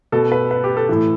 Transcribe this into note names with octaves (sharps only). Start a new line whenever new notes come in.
B2 A4
B4
B4
G4
A4
A2 E3